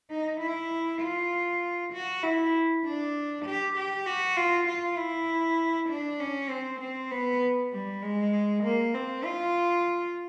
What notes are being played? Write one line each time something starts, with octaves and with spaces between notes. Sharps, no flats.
D#4
E4
F4
F#4
E4
D4
G4
G4
F#4
F4
F4
E4
D4
C#4
C4
C4
B3
G3
G#3
A#3
C4
F4